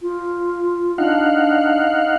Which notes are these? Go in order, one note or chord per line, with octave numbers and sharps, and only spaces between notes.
F4
D4 D#4 F5 F#5